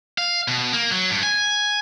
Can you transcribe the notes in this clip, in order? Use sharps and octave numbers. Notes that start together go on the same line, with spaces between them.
F5
B2
A#3
F#3
G2
G#5